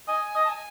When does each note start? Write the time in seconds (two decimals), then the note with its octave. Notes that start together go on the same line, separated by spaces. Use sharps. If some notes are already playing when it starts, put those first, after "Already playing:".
0.08 D#5 G#5
0.36 D#5
0.45 A5
0.49 G#5